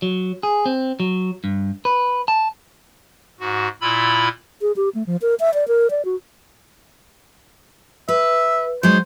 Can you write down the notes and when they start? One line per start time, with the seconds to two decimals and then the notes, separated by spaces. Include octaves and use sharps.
0.02 F#3
0.43 G#4
0.66 C4
1.00 F#3
1.44 G2
1.85 B4
2.28 A5
3.40 G#2 F#4
3.81 A#2 E4 F4 B5 E6
4.62 G#4
4.76 G4
4.95 A3
5.06 F3
5.22 A#4
5.40 E5
5.54 D5
5.68 A#4
5.91 D5
6.05 F#4
8.08 B4 E5
8.83 F#3 G#3 D#4 C5